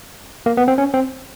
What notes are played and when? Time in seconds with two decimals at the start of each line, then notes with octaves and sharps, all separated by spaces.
0.46 A#3
0.57 B3
0.68 C4
0.78 C#4
0.94 C4